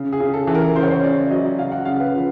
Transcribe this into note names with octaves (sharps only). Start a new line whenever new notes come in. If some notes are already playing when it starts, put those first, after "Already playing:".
Already playing: C#3
G#4
C#3
A4
E3
A#4
C#3 C5
C#5
C5
C#3 D5
F#3 D#5
C#3 F5
F#5
C#3 F5
B4
F3